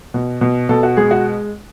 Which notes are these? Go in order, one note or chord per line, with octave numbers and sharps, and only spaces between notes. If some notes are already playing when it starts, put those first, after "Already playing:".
B2
B2
B2 A4
F#4
G#3 G#4
F#4